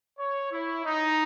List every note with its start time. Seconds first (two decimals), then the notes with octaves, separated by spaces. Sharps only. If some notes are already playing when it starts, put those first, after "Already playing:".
0.19 C#5
0.52 E4
0.85 D#4